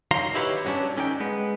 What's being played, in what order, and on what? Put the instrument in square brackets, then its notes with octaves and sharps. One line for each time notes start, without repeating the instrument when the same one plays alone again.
[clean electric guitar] D#3 F#3 F5 A#5 C6
D#4 E4 G4 B4 C#5
G2 F#3 A#3 B3 C#4 D4
D3 C#4 D#4 G5
G#3 B3